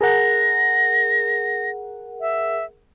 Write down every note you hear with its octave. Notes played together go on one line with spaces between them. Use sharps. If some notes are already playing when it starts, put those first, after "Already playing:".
G#4 A#4 F#5 A#6
E5